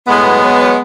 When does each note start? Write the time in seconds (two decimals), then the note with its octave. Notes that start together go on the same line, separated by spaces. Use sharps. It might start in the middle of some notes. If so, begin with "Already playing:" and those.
0.08 A2 G#3 B3
0.26 F#3
0.43 F#3
0.60 F#3